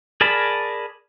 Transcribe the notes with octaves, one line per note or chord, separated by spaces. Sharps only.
G#4 A#4 D5 A5 B5